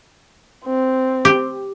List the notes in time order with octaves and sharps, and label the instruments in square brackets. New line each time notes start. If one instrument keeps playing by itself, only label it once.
[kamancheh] C4
[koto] G4